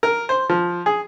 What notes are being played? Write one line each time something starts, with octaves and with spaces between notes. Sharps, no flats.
A#4
C5
F3
G#4